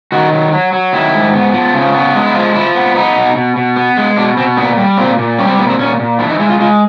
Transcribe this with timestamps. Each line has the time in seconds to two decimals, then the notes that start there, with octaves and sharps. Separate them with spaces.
0.12 D#3 F#4
0.32 F#3
0.52 F#3
0.73 F#3
0.93 D#3 E4
1.13 G#2
1.33 B3
1.54 F3
1.74 C#3
1.94 B3
2.14 G#3
2.26 E4
2.34 F3 F4
2.55 F3 E4
2.75 B3
2.95 B3 D#4
3.16 B2
3.35 B2
3.56 B2
3.76 B3
3.97 G#3
4.16 B2 D4
4.37 B2 C4
4.57 A#2 B3
4.77 G3
4.97 A#2 C4
5.18 A#2
5.38 G3 C#4
5.48 C4
5.58 A#2 B3
5.69 C4
5.79 A#2 C#4
6.00 A#2
6.19 E3 D4
6.30 D#4
6.40 G#3 E4
6.49 F4
6.60 G#3 F4